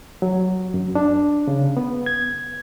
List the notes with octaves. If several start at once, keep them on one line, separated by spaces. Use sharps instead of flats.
F#3
F#2
D4
C#3
B3
G#6